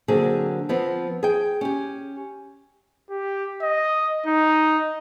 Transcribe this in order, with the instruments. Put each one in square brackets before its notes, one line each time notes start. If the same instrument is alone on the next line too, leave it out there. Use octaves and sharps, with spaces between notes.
[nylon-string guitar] D3 F#3 A#3 C4 G#4
F3 B3 C4
G#4 G5
C#4 G4
[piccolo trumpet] G4
D#5
D#4